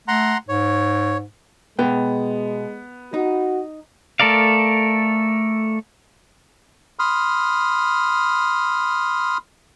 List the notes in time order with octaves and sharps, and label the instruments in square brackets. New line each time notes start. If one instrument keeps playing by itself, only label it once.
[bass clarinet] A3 [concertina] F#5 A#5 C6
[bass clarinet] G#2 [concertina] C#5
[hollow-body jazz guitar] B2 G5 [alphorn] G#3 [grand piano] B3
[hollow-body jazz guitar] D#4 [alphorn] F#4
[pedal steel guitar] A3 A4 A#4 D5 F5
[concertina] B5 C6 D#6 F6